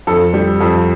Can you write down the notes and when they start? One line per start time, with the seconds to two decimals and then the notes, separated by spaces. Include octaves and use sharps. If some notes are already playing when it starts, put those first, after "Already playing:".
0.07 F2 A4
0.34 G3
0.61 F2